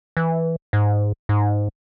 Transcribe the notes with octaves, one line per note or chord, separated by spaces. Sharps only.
E3
G#2
G#2